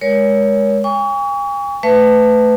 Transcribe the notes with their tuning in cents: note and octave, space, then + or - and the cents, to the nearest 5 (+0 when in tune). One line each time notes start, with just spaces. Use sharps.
G#3 +0 A#4 +30 C#5 +20
G#5 -45 C#6 +35
A3 +0 B4 +25 E5 +40